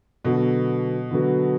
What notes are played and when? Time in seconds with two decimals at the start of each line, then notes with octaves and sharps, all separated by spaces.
0.24 B2 D3 F#3 B3 F#4 A4
1.11 D3 F#3 B3 F#4 A4